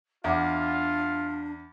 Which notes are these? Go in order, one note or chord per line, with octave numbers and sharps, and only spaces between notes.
E2 D4 F4 E5 F#5 D6